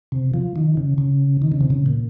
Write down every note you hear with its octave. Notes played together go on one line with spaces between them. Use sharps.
C3
F3
D#3
C#3
C#3
D#3
C#3
C3
C#3
A#2